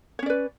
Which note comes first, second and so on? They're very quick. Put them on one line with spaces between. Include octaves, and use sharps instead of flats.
C#5 C#4 D5 B4